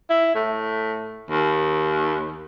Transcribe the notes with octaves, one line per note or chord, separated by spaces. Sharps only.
E4
A2
D#2